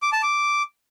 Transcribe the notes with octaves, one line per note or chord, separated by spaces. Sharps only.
D6
A5
D6